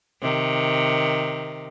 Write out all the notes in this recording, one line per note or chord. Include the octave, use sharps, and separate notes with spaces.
C3 D#3